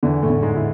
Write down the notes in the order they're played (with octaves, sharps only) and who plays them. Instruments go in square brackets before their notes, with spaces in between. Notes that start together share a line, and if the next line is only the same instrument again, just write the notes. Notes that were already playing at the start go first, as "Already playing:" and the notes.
[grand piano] E2 E3 [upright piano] D3
[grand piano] A2 A3
[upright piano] D3
[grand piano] G#2 G#3
[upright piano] E4